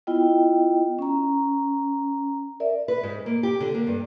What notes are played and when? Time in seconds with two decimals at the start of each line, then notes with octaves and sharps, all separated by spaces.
0.07 B3 E4 F4 D#5 G5
0.99 C#4 A#5
2.60 A#4 D5 E5
2.88 B4
3.03 G#2
3.26 A#3
3.43 G4
3.60 D3
3.74 A#3
3.87 G2